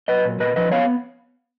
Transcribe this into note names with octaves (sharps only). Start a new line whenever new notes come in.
F#3 B4 D#5
A#2
A#2 B4 D#5
F3 B4 D#5
B3 C#5 F5